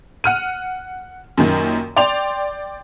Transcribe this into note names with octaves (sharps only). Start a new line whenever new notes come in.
F#5 F6 D#7
F#2 A#2 D#3 A#3
D5 G5 C6 F7